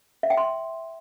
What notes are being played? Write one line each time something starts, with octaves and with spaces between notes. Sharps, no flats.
E5
G5
C6